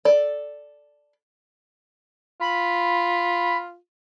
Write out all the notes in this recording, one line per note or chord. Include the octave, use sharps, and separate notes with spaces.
A4 D5
F4 B5